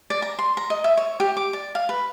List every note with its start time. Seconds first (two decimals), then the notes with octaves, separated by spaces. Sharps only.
0.10 D5
0.22 A#5
0.39 C6
0.57 A#5
0.70 D#5
0.84 E5
0.97 C#5
1.20 G4
1.37 D6
1.53 D5
1.75 F5
1.89 B4